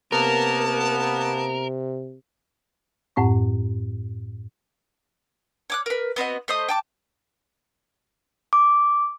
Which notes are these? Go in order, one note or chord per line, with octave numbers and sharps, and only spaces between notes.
C3 A#3 B3 A#4 A5
F#2 A2 C4 C#6
C#5 D6 F#6
A#4 B4
B3 C4 F#4 D#5
A3 C5 D#5 D#6
G5 A5 D6
D6